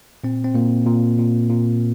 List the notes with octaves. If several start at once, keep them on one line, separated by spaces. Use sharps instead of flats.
A#2 C4
C4
A#2 A#3
A#2
A#2
A#2